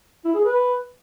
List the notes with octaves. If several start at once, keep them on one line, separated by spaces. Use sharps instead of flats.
E4
G#4
B4